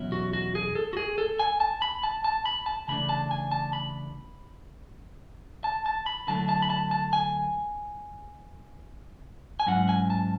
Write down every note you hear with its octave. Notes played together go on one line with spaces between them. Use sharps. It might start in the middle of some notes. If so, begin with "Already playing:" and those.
Already playing: E2 B2 F#3 C#4 E4
F#4
F#4
G#4
A4
F#4
G#4
A4
G#5
A5
B5
A5
A5
B5
A5
C#3 E3 A3 D4 B5
A5
G#5
A5
B5
A5
A5
B5
D3 F#3 A3 E4 A5
A5
B5
A5
A5
G#5
G#5
G#2 F#3 C#4 E4 F#5
G#5
A5